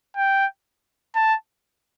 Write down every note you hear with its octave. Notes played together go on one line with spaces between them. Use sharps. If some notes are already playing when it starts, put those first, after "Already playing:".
G5
A5